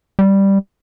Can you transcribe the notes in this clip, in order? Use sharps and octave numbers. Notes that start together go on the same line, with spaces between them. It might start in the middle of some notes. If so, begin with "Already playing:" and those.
G3